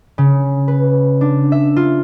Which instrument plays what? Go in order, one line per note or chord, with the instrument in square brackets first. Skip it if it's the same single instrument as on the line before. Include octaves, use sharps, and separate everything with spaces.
[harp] C#3
B4
D4
E5
F4